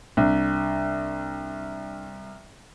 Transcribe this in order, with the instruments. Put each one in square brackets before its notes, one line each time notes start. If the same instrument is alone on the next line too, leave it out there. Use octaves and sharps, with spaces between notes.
[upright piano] C2 [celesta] D4